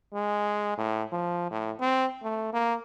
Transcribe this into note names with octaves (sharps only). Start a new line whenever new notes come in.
G#3
A2
F3
A2
C4
A3
A#3